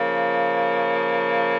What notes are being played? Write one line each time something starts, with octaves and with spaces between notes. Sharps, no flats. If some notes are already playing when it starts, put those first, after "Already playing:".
Already playing: C#3 F3 A#3